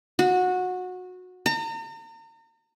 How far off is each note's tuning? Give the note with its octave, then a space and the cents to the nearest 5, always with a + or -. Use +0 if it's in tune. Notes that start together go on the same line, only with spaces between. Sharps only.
F#4 -20
A#5 -40